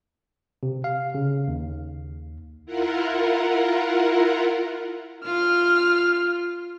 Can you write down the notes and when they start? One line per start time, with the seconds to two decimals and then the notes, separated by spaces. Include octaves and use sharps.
0.63 C3
0.84 F5
1.15 C#3
1.48 D#2
2.66 E4 F4 A#4 F#5
5.26 F4 F6